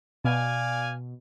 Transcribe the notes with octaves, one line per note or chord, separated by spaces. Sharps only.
B2 D5 F5 G#5